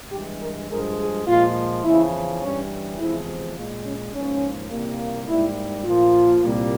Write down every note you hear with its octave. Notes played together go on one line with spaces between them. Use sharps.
G2 E3 G#3 G4
A#4
G2 F3 G#3 A#4
G#4
A#2 F3 G#3 F4
E2 C#3 F3 E4
G2 E3 G3 C#4
E2 C3 F3 G#3 E4
A#2 G#3 F4
C#4
G#2 F3 A#3 C#4
C2 A#2 G3 A#3
G#2 G3 A#3 E4
A#2 F3 A#3 F4
C2 A#2 G3 A#3